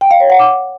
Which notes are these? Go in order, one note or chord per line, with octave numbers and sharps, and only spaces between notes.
G5
F5
C#5
F#5
D6